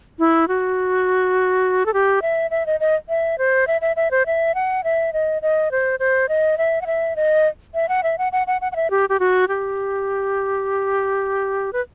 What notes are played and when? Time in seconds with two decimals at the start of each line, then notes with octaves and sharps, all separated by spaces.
0.19 E4
0.48 F#4
1.86 A4
1.94 G4
2.22 E5
2.51 E5
2.66 D#5
2.80 D#5
3.09 E5
3.38 C5
3.67 E5
3.81 E5
3.96 E5
4.11 C5
4.26 E5
4.55 F#5
4.84 E5
5.13 D#5
5.42 D#5
5.72 C5
6.00 C5
6.29 D#5
6.58 E5
6.82 F#5
6.87 E5
7.16 D#5
7.74 E5
7.89 F#5
8.03 E5
8.18 F#5
8.32 F#5
8.47 F#5
8.61 F#5
8.72 F#5
8.76 E5
8.91 G4
9.09 G4
9.20 F#4
9.48 G4
11.73 B4